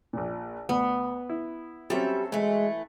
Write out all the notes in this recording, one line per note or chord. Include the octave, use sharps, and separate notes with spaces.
A#1 A#2
D2 B3
E4
F#3 G3 C4 C#4 A4 E5
E3 G#3 A3